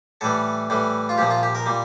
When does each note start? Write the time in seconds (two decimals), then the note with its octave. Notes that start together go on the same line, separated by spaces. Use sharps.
0.21 A2 E3 G3 A4
0.70 A2 E3 G3
1.09 F4
1.18 C2 A#2 F3 G4
1.30 F4
1.43 G4
1.55 A#4
1.66 A#2 G3